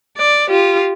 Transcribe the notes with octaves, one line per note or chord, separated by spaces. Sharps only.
D5
F4 G4